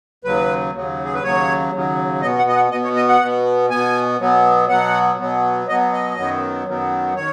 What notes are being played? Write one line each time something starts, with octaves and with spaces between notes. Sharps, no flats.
D#2 C#3 F#3 B4
D#2 C#3 F#3
G#4
B4
D#2 C#3 F#3 C#5
D#2 C#3 F#3
B2 B3 D#5
F#5
D#5
F#5
B2 B3 D#5
C#5
D#5
F#5
B2 B3
B2 B3 G#5
B2 F#3 B3
B2 F#3 B3 F#5
B2 F#3 B3
B2 F#3 B3 D#5
D#5
F#2 D#3 F#3 B3
F#2 D#3 F#3 B3
D#3 C#5